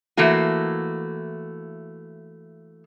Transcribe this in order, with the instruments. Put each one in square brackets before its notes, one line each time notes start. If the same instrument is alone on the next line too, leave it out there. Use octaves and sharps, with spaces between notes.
[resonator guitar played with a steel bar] E3 A3 A#3 F#4